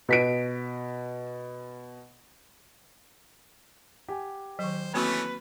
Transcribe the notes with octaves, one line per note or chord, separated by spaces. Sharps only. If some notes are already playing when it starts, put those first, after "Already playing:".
B2 B6 D7
G4 F#5 G#5
D#3 F#3 C5
E3 A3 A#3 C4 C#4 F#4 B4